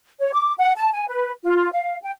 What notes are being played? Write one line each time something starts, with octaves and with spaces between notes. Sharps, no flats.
C#5
D6
F#5
A5
G#5
B4
F4
F5
G5